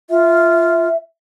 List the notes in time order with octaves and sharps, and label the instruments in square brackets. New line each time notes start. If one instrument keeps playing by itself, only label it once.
[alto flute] F4 [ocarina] E5